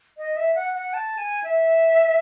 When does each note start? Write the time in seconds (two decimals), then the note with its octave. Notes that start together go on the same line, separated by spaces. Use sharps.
0.18 D#5
0.37 E5
0.55 F#5
0.73 F#5
0.94 A5
1.18 G#5
1.44 E5